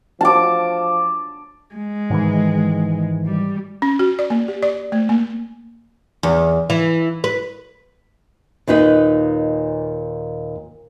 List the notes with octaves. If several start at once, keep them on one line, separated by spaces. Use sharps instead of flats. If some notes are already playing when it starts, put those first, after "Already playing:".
F3 A5 D6
G#3
G#2 D#3 E3
G3
C#4
F#4
D5
A#3
G4
D5
A3
A#3
E2
E3
B4
D#2 A#2 D#4 B4 D#5